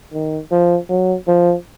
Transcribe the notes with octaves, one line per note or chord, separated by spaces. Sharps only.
D#3
F3
F#3
F3